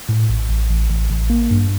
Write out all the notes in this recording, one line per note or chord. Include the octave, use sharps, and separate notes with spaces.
A2
A1
A1
A1
A1
A1
A#3
G2